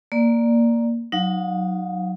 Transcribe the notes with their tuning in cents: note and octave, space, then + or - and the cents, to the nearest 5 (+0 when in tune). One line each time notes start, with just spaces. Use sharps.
A#3 +0 D5 +0
F#3 +0 D#4 +0 F5 +35